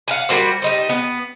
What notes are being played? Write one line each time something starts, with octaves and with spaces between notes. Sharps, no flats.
F5 F#5 G#5
G3 A#3 F#4 C5
G3 D#4 C5
B3